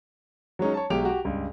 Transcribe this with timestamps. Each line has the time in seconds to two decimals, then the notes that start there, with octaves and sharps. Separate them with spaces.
0.59 F#3 G#3 C#4 D#4
0.74 C#5 A5
0.90 B1 F#3 G#3 G4 D7 F7
1.05 F#4 G4
1.25 C#2 G2